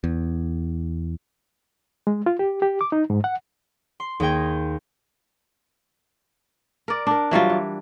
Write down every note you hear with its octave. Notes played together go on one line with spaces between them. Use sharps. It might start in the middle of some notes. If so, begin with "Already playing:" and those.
E2
G#3
F4
G4
G4
D6
D#4
G#2
F#5
C6
D#2 G#4 D#5 G5 G#6
A#4 D5
D4 A#4
E3 F#3 G3 F4
E3